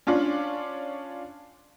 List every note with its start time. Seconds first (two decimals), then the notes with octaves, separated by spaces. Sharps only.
0.07 C#4 D4 F4 D5